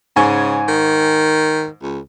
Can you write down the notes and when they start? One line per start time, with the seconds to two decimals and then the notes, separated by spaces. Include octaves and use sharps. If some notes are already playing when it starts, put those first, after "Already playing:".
0.16 G#2 C#3 G#5 C#6
0.68 D#3
1.82 C#2